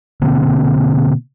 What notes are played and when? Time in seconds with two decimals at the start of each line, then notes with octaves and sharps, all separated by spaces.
0.22 B2 D3 A#3 C4